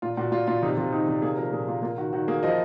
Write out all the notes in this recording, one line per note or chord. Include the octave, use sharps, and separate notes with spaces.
A#2 F4
A#2 F#4
A#2 F4
A#2 F4
C3 D#4
C3 F4
D#3 D#4
C3
A#3 G#4
F3 A#4
A#2 G#4
A#3 F4
A#3 F4
D#3 F#4
D#3 F#4
A#3 G#4
F3 D#5